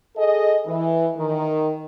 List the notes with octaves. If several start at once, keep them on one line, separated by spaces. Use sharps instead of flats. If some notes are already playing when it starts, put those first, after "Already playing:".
G#4 A4 D#5
E3
D#3